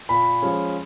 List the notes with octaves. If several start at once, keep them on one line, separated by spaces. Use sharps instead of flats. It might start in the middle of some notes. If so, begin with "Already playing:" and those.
A#2 B5
F3 G#3 C#4